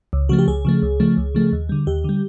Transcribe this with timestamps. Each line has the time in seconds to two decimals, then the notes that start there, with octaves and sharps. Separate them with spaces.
0.13 C#2
0.29 C#3 F3 A3 F#4
0.38 G4
0.48 C#2 G#4
0.65 C#3 F3 A3
0.82 C#2
1.00 C#3 F3 A3
1.17 C#2
1.35 C#3 F3 A3
1.52 D#2
1.69 D3 G3
1.87 D#2 G4
2.04 D3 G3